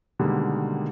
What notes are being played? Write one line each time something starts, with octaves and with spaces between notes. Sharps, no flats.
B2 D3 D#3 G3 G#3 A#3